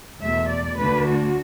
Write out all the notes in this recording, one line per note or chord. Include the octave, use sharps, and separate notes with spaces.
E2 B2 A3 E5
D5
D2 D3 A3 D4 B4
F#4